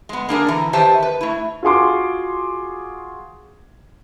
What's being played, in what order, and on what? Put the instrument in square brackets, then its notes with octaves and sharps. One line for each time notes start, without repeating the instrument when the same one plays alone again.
[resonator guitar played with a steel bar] G#3 B3
A#3 D4 G#4 A#4
D3 E3 A#5
D#3 G4 B4 C5 E5 A5
B4
A3 E4
[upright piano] F4 F#4 G#4 C6 D6